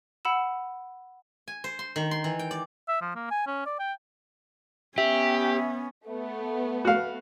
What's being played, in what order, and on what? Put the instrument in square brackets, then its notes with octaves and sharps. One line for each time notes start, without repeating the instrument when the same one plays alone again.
[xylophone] F#5 B5 E6 E7
[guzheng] G#5
C5
C6
D#3
C6
E3
G5
D5
[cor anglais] E5
F3
A#3
G#5
C#4
D5
G5
[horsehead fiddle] B3 C#4 [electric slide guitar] G4 [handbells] E5
[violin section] A3 B3
[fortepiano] F#4 F5